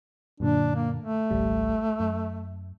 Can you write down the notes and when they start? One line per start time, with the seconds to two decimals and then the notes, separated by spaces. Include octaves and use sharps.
0.40 F#2 A#2 D3 D4
0.75 A#3
1.00 A3
1.30 G#1 C#2 G3
2.00 F#2